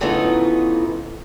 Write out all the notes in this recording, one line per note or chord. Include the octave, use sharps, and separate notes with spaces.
C#3 E3 F3 A3 B3 D#4